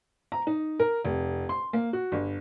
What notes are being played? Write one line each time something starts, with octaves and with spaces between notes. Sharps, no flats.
A#5
D#4
A#4
F1
C6
A#3
F#4
G1